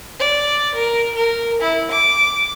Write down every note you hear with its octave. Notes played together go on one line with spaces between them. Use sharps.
D5
A#4
A#4
E4
D6